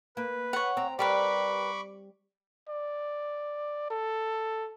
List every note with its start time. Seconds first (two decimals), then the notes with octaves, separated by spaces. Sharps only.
0.17 A#3 B4
0.53 C#5 F#5
0.77 C4 A#5
0.99 G3 G4 A#4 B4 B5 C#6 D6
2.69 D5
3.90 A4